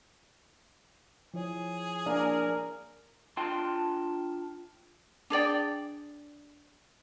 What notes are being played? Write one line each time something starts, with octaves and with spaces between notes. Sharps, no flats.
F3 E4 G#4 C#5
A#3 D4 A#4
D4 F4 G5 A5 C6
D4 G#4 D5 G5